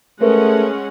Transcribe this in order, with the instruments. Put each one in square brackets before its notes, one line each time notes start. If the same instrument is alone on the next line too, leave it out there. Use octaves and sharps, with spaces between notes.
[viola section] G#3 C#4 F#5 [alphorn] A3 [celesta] A#4 B4